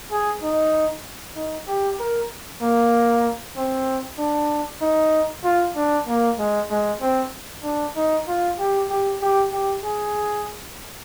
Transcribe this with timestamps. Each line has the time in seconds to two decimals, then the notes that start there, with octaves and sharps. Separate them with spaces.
0.11 G#4
0.42 D#4
1.36 D#4
1.67 G4
1.99 A#4
2.61 A#3
3.56 C4
4.18 D4
4.81 D#4
5.44 F4
5.76 D4
6.07 A#3
6.38 G#3
6.70 G#3
7.01 C4
7.63 D4
7.96 D#4
8.27 F4
8.58 G4
8.90 G4
9.22 G4
9.52 G4
9.83 G#4